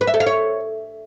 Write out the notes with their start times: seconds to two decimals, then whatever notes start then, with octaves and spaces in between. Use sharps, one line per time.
0.01 B4
0.07 E5
0.14 A4
0.20 F5
0.27 C#5